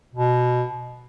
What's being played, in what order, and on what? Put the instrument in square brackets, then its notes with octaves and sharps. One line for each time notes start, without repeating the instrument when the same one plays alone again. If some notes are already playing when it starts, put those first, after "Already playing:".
[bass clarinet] B2